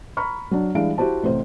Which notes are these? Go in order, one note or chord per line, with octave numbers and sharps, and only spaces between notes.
A#5 B5 C#6 F6
F#3 D4
E3 G3 G#3 D4 F5 D7
E4 F#4 G4 C5 A5
A1 C3 C5